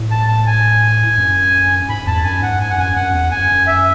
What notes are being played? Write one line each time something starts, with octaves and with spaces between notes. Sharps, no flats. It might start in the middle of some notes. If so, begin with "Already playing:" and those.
Already playing: A2
A5
A5
G#5
F#2
G#2 B5
E2 A5
F#2 G#5
G#2 F#5
G#5
F#5
F#2 G#5
F#2 F#5
E2
F#2 G#5
E5